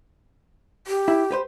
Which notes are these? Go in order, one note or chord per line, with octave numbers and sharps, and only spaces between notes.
G4
E4
G4 B4 C5